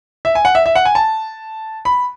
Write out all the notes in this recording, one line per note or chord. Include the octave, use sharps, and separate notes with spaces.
E5
G#5
F#5
E5
E5
F#5
G#5
A5
B5